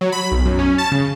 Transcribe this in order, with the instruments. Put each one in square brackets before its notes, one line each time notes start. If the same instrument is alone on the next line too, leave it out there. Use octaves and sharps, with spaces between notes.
[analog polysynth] F#3
B5
B1
F#2
C#4
A5
C#3